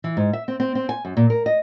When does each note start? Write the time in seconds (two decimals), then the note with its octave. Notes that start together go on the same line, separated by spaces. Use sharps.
0.04 E3
0.17 G#2
0.33 E5
0.48 C4
0.60 C4
0.75 C4
0.89 G#5
1.05 F#2
1.17 A#2
1.30 A#4
1.46 D#5